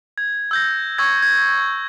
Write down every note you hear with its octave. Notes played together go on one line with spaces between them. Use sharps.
G#6
E6 G6 A#6
C#6 E6 G#6
G#6